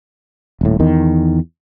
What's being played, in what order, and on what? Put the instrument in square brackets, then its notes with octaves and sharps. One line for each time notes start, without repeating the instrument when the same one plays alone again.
[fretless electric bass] D#1 A2
E2 D#3